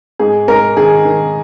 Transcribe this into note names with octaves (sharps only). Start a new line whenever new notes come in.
G#2 G#4
G#2 A#4
D#3 G#4
D#3